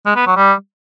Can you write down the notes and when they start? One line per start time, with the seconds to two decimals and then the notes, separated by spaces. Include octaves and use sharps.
0.06 G#3
0.16 B3
0.26 F#3
0.37 G3